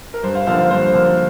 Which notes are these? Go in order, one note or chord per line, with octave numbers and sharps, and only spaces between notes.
A#4
G2 C5
C5 F5
D3 F3 A#3 C5 F5
C5 F5
G2 C5
D3 F3 A#3